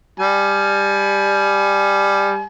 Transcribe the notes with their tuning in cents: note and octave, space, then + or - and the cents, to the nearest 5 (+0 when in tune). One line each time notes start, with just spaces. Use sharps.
G3 +15 G#5 +35